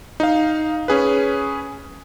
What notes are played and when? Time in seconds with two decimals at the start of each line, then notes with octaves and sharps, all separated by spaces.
0.20 D#4 F5
0.88 C#4 G#4 B4